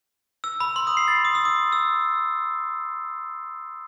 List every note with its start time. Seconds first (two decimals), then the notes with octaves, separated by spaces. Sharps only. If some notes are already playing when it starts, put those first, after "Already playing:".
0.44 E6
0.60 B5
0.76 C6
0.87 D#6
0.97 C7
1.08 A6
1.25 D#6
1.35 E6
1.45 D#6
1.72 E6